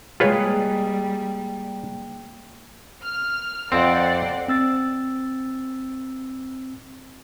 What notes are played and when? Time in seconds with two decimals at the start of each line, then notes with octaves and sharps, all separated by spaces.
0.20 G3 G#3 A#3 F4 G#4 B4 C#5 G5
3.04 F6
3.72 F2 C4 C5 D5 F#5
4.48 C4 E6 A6